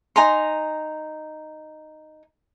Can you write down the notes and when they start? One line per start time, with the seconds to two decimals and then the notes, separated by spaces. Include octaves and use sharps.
0.16 D#4 G#5 A#5 C6